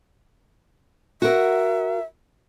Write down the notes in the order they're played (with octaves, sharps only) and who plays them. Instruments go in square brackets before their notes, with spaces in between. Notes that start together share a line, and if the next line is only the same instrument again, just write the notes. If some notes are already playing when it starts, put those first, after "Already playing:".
[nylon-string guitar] F#4 A#4 [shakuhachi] E5